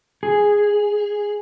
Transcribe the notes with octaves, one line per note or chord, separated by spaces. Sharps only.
G#4